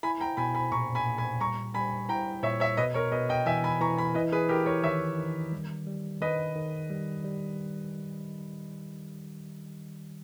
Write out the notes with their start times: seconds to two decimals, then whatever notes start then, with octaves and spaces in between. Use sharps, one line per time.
0.03 E4 G#5 B5
0.20 G5 A#5
0.37 B2 G#5 B5
0.54 G#5 B5
0.72 A#2 A#5 C#6
0.95 G#5 B5
1.06 A#2
1.18 G#5 B5
1.40 G3 A#5 C#6
1.74 G3 G#5 B5
2.09 E4 G5 A#5
2.43 A#2 C#5 E5
2.60 C#5 E5
2.77 B2 B4 D#5
2.94 A#4 C#5
3.12 B2 B4 D#5
3.29 D#5 G5
3.46 E3 E5 G#5
3.64 G#5 B5
3.81 E3 A#5 C#6
3.97 G#5 B5
4.14 E4 B4 D#5
4.32 G#4 B4
4.49 E3 G4 A#4
4.66 A#4 C#5
4.83 D#3 C#5 E5
5.18 D#3
5.52 G3
5.87 G3
6.21 D#3 B4 D#5
6.56 D#3
6.90 G3
7.24 G3